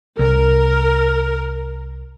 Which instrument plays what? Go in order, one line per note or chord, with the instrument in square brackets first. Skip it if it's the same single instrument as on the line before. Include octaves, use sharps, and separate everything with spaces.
[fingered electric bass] C2 [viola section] A#4